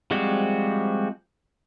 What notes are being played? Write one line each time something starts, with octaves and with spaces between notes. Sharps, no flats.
F3 G3 G#3 C4 F#4